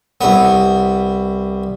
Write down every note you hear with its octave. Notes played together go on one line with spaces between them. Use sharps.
C2 B3